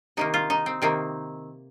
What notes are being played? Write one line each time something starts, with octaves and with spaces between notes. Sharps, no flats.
C3 D#3 A#3 D#4
F4
D#4
C4
C3 D#3 A#3 C4